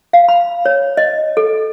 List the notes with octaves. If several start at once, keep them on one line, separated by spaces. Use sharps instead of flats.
F5
B5
C#5
D#5
A4